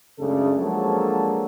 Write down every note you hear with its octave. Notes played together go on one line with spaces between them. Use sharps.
C#2 F#2 C#3 A3 D4 A4
F3 F#3 G#3 A#3 D4 A4